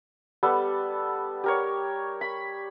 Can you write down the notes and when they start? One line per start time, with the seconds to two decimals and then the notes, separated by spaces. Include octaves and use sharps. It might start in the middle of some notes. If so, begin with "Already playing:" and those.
0.43 G3 B3 A4
1.44 G4 A#4 C#5
2.21 B5